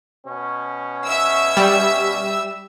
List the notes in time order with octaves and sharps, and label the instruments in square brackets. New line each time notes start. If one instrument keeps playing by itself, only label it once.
[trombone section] B2 C#4
[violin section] E5 E6
[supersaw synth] G3